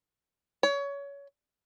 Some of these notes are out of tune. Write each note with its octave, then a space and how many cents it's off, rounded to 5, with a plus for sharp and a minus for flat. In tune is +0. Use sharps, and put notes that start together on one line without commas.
C#5 +25